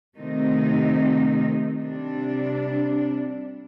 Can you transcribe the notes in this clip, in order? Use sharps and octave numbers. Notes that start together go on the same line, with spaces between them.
C3 D#3 A3 C4 D#4
C3 G3 D4